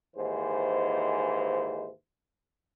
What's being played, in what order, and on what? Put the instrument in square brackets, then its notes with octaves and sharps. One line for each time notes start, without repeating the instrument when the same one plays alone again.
[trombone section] D#2 G#2 E3 C5